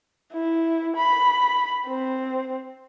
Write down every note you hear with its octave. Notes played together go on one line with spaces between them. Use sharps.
E4
B5
C4